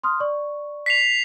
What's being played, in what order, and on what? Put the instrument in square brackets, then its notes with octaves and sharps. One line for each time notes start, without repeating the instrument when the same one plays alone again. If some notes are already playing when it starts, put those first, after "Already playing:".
[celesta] C6 D#6 F6
D5 C#6
[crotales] B6 C7 F7